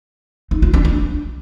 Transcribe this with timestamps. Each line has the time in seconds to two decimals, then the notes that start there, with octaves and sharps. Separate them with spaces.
0.51 D#4
0.62 F4
0.74 D4
0.85 D4